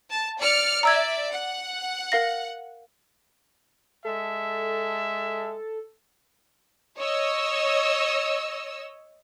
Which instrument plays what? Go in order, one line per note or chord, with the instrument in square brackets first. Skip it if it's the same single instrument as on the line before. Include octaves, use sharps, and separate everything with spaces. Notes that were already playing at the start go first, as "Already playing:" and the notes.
[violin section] A5
D5 F6 C#7
[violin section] D5 E5 [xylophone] A#5 E6 G#6
[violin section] F#5
[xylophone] A#4 F5 A#6
[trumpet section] G#3 E5 [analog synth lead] A4
[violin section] C#5 D#5 E6